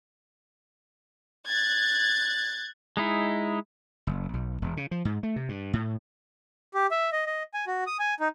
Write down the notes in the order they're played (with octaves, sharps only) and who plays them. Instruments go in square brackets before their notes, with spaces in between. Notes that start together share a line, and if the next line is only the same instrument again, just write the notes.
[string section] F#6 G#6 A6
[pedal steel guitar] G#3 D#4 E4
[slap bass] F#1
B1
E1
C#3
F3
G#2
A3
C3
G2
A2
[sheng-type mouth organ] G4
E5
D#5
D#5
G#5
F#4
D#6
G#5
D#4